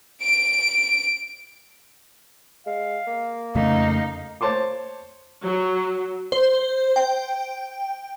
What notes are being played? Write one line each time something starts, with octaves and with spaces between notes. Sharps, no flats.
D7
G#3 F5
A#3
F2 C#3 A3 D#4 F5
C5 C#5 A5 C6 D6
F#3
C5
G5